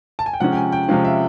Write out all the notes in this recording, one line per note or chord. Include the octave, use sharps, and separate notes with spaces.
A5
G#5
G5
C3 F3 G#3 C#4 F#5
G5
G#5
G5
C3 F3 G#3 C#4 F5
E5